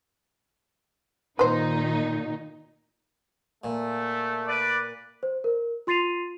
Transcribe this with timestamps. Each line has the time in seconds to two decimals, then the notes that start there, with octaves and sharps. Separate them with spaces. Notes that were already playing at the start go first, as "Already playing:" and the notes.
1.39 A#2 D#3 D#4 B4 C5
3.64 A#2 A3
4.47 B4 D5
5.23 C5
5.44 A#4
5.87 F4 C6 A6 C7 D#7 F7